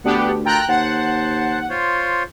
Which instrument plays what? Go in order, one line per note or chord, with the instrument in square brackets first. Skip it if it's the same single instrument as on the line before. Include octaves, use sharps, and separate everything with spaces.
[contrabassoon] D2 [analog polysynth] B3 D4 G4 [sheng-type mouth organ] F#5
[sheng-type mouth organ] F4 A4 A#4 [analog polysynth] G5 A#5 F#6
[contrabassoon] D#2 [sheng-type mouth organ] C5 A5 [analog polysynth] F#5
[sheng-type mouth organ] F4 C5 C#5